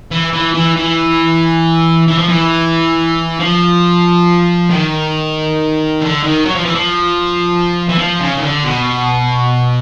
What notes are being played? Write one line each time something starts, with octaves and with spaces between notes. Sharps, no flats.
E3
E3
E3
E3
E3
F3
E3
F3
D#3
D3
D#3
F#3
F3
E3
F3
E3
F3
C#3
D#3
D3
B2